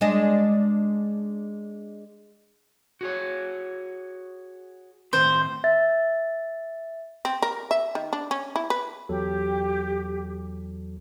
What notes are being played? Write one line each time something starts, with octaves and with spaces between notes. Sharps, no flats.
G#3 D4 D#5
F#4 G#4 C#5
A2 D#3 C4 C5
E5 A6
C4
A#4
E5
D#3
D4
C#4
E4
B4
E2 F#3 G4 A4